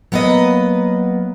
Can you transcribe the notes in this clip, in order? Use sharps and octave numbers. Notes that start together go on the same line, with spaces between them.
F#3 A#3 B3 B4 D#5